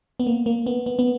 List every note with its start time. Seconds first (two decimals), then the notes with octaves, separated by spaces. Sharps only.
0.20 B3
0.27 A#3
0.46 A#3
0.66 B3
0.86 B3
0.99 B3